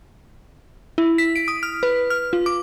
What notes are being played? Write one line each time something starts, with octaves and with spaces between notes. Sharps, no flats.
E4
B6
D7
D#6
F6
B4
F6
F4
D6